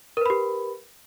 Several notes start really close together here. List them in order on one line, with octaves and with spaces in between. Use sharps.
A#4 B4 B5 G4